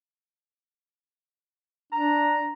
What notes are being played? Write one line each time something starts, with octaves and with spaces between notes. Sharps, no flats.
D4 A#5